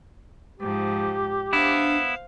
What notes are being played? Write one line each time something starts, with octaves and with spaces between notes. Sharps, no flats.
G#2 F3 G4
B3 D4 E4 C5 F5